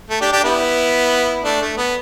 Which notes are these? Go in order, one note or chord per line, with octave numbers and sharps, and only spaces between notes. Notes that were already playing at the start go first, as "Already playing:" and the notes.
A3
D4 G4
D4 G4
B3 E4
A3 D4
A3
B3